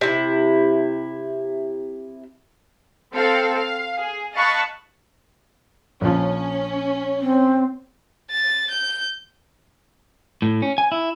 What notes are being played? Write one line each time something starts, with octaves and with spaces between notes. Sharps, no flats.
C3 E4
C4 A4 F5
F5
G#4
D#5 F5 A5 B5 C#6 F#6
A#1 F3 C#4
C4
A6
G6
A2
C#4
G#5
E4